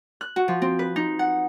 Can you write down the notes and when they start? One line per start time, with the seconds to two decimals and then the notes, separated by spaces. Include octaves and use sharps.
0.21 F#6
0.36 F#4
0.48 F3
0.62 C4
0.79 B4
0.96 D#4
1.19 F#5